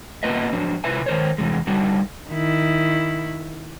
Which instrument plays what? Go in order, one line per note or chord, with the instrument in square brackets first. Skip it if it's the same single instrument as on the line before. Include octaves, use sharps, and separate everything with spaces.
[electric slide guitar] A#3 B3 F4 B4 D#5 E5
F3 F#3 D4
C3 E4 F4 B4 E5 G#5
D#3 A#4 C5 C#5
E2 C3 E3 G#3
D3 G3 D#4 F#4
[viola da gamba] D#3 E4